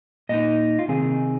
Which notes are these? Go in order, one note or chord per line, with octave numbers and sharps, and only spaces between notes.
A#2 A#3 D#4 D#5
F4
C3 D#3 C4 D#4 G#4